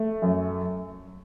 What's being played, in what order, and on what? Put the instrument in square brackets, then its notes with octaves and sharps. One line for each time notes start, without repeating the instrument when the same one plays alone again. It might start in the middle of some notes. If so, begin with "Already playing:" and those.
Already playing: [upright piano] A3
F#2